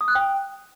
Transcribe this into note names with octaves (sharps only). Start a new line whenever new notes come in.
D#6
F#6
G5